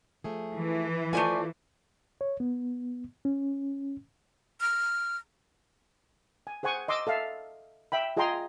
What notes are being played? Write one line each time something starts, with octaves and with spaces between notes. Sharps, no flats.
F3 A3 G#4
E3
A3 F4 A4 C5 D5 G#5
C#5
B3
C#4
F6
G#5
G#4 C5 F#5 G#5 C#6
D#5 C6 D6 E6
A4 E5 F5
E5 G5 B5
F4 G#4 D#5 G5 A#5 C6